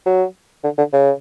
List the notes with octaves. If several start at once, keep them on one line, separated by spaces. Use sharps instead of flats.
F#3
D3
D3
C#3